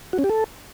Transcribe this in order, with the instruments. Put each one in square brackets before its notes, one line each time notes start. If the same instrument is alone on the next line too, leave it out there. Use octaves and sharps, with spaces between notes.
[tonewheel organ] F#4
C#4
G4
A4